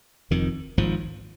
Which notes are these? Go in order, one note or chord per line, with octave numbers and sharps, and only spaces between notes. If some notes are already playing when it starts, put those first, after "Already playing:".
F1 F2 D#3
G#1 G#2 F3